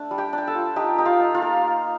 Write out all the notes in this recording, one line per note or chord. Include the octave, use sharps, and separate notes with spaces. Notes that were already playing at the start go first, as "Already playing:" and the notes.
Already playing: A3 D4
G3
G4 G5
D4
G5
A4 A5
F4
D#4 G4 G5
D#4 G5
F4 F5
D#4
F4 F5
A#3